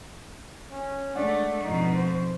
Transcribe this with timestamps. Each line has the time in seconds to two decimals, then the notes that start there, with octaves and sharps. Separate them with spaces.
0.71 C#4
1.15 G#3 A3 D4 D5 F#5
1.63 F2 B2 D#4
1.95 C5